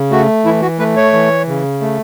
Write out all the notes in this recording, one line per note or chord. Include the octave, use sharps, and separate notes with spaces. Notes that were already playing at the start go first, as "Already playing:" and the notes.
Already playing: C#3
A3 F#4
E3 E4
F#4
A3 B4
C#5
E3
C#3
A3